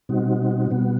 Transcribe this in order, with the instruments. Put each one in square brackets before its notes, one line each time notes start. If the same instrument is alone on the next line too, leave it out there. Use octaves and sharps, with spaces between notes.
[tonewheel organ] B2 G3 C4 D#4 F#4
B2 G3 B3 F#4